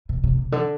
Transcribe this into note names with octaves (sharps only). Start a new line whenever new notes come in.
B2
C3
C3
D3